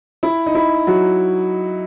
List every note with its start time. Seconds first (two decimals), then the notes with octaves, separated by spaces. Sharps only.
0.23 E4
0.46 D#4
0.55 E4
0.87 F#3 F#4